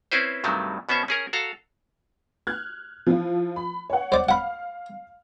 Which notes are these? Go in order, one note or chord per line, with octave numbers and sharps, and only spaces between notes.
C4 C#4 E4 B4 C5
G2 C3 D#3 F#3 G3 A3
B2 B3 C#4 C5 E5
C#4 G#4 A#4
F#4 A4 F5 A#5
F6 F#6 G#6
F3 E4 F4
B5
C#5 F#5
C5 D5
F5 F#5 B5 F6